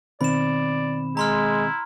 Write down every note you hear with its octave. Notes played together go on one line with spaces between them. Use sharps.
B2 D#3 C4 D5 B5 E7
G#3 E4 A#5 C6 F6